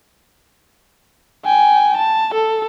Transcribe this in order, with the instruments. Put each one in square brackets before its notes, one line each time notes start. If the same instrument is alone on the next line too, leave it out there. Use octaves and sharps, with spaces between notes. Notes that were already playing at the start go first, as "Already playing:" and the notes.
[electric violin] G5 G#5
A5
A4